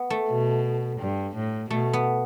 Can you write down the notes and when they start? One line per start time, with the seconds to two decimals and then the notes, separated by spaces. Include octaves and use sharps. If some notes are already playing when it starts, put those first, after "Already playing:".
Already playing: B3
0.10 A3
0.29 B2
1.00 G2
1.36 A2
1.70 B2 A3
1.93 B3